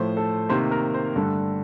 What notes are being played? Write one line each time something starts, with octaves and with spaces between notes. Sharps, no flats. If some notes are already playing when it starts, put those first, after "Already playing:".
Already playing: A2 F3 A3 C5
A4
C3 D#3 A#3 C5
A#4
C5
G2 D3 A3 A4